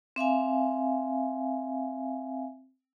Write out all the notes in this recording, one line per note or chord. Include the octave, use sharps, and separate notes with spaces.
C4 E5 F5 G#5